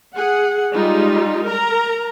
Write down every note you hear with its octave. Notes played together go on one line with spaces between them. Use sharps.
G#4 F#5
G3 G#3 D#4 F4
A#4 A#5